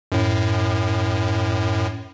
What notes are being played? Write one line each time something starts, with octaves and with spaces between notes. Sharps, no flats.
F#2 A2